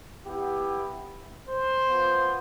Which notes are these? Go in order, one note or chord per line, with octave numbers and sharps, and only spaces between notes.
B3 E4 G4
C5
B3 F4